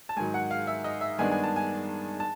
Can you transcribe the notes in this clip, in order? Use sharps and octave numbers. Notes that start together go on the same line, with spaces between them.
A5
G#2 D#3 F#3 G#5
F#5
F5
E5
D#5
E5
G2 D#3 G#3 B3 D4 G#5
G#5
A5
G#5
A5